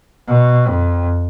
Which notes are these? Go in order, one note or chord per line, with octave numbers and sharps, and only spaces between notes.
B2
F2